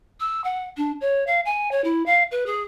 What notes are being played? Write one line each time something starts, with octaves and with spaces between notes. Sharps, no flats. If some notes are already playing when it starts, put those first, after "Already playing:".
E6
F#5
D4
C#5
F5
G#5
C#5
E4
F5
B4
G#4